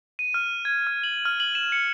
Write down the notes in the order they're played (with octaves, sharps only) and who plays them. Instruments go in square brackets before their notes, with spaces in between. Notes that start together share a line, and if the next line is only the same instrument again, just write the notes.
[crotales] D#7
F6
G#6
F6
F#7
F6
F#7
E7
C#7